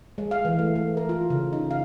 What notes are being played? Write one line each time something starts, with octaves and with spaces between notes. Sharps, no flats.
G#3
F5
E3
A3
A3
A#4
F4
C#3
D#4
F5